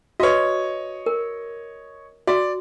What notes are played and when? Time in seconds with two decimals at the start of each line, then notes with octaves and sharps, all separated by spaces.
0.20 F#4 B4 C#5 D#5
1.06 A#4
2.27 F#4 D5